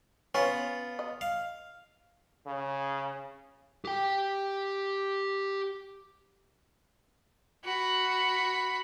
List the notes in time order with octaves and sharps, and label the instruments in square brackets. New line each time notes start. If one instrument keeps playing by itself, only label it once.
[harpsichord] B3 F4 [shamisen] C#4
[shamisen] D#5
[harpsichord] F5
[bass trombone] C#3
[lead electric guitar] G4 G5
[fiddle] F#4 B5